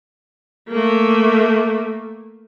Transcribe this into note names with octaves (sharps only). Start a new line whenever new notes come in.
A3 A#3